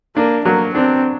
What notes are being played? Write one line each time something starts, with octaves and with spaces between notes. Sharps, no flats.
A#3 D4
F#3 A#3
C4 D4